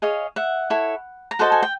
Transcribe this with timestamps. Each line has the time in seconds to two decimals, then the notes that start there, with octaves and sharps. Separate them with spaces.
0.02 G#4 C#5 D#5 F5
0.36 E5 F#5
0.70 E4 A4 C#5
1.31 A#5
1.39 F#4 A4 C5 D#5 A5
1.52 G#5
1.62 G5